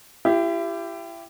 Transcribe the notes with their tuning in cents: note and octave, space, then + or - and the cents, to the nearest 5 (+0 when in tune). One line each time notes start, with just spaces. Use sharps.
E4 +35 G4 +0